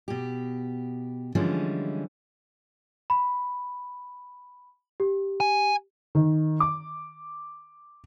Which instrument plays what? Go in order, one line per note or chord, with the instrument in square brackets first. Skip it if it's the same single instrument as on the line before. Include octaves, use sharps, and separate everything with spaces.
[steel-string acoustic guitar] B2 G4
D3 E3 F3 G3 G#3 C#4
[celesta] B5
G4
[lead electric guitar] G#5
[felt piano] D#3
D6